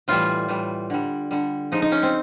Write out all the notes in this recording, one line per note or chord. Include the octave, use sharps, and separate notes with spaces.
A2 E3 G3 F4
A2 E3 G3
D3 G3
D3 G3
C#3 F3 G#3 D#4
D#4
C#4
C4